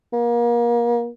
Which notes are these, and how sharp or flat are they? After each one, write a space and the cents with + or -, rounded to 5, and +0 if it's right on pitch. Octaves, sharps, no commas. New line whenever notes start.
A#3 +30